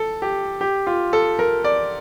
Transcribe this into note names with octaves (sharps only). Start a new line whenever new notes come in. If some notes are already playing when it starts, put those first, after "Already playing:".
Already playing: A4
G4
G4
F4
A4
A#4
D5